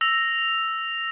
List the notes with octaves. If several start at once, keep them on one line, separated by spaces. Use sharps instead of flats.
E6 A#6 F7